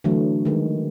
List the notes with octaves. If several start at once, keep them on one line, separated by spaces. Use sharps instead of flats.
D3 E3 F#3 A3
D#3 G#3